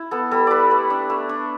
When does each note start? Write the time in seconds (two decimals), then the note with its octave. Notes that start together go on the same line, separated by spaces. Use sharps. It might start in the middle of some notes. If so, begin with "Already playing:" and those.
Already playing: E4
0.11 B3 A4
0.31 G3 A4
0.47 G3 B4 D5
0.70 A3 B4
0.90 D4
1.10 A3
1.29 D4